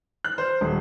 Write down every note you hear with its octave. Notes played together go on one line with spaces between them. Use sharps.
F#6
C5
D#1